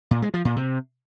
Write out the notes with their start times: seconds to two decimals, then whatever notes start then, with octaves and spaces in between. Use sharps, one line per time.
0.11 A#2
0.22 G#3
0.34 F3
0.45 A#2
0.56 C3